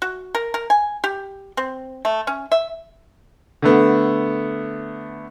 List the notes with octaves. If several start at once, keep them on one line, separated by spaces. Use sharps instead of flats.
F#4
A#4
A#4
G#5
G4
C4
A3
C#4
E5
D3 A3 B3